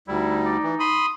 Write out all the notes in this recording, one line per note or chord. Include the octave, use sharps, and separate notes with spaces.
D2 G3 D#4 E4
D5
E3
B5 C6 D#6